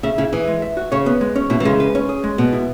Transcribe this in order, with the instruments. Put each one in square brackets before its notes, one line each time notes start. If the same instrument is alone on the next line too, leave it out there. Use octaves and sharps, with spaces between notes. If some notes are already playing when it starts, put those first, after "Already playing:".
[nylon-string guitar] C#3 [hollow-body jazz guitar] E5
[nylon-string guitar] C#3 [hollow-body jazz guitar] E4
[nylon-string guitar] E3 [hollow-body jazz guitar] G#4
[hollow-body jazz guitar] G#3
E5
F#4
[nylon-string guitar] C#3 [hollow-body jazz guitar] C#5
[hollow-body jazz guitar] B3
G#3
C#4
[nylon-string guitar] B2 [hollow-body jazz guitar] E4
[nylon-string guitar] E3
[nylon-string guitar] C#3 [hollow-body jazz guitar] G#3
[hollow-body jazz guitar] B4
C#4
G#4
G#3
[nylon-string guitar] B2 [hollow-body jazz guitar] B3
[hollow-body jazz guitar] E4